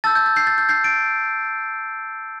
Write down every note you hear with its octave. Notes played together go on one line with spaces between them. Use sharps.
A5 E6 G6 A6
G6
A6
G6 C7
A6
G6
G6 C7
A6 D7